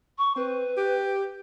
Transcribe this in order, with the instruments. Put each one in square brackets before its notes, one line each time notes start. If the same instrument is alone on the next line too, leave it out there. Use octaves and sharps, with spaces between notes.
[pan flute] C#6
[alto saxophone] C4 [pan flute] B4
[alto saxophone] G4